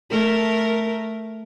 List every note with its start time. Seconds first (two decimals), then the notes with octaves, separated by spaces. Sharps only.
0.10 A3 A#4